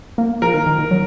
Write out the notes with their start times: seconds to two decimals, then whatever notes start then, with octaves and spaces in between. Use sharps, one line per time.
0.18 A#3
0.42 F3 A#4
0.54 D#3
0.67 D#3
0.79 D#3
0.91 F#3